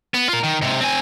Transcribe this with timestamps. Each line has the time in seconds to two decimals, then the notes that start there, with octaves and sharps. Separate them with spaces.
0.14 B3
0.29 F4 A#4
0.44 D#3
0.62 G#2 C3
0.81 C4 G#5